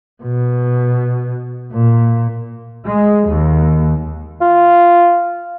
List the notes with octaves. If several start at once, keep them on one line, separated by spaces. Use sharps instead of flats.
B2
A#2
G#3
D#2
F4